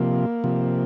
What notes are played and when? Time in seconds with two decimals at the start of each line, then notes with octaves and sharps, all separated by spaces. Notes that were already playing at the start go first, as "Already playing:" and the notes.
Already playing: C3 F3 A#3
0.44 C3 F3